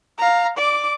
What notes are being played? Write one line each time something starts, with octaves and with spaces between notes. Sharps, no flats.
F5 A#5
D5 D6